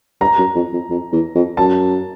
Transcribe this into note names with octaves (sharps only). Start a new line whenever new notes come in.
G2 A#5
F#2
F2
F2
F2
E2
F2
F#2 A5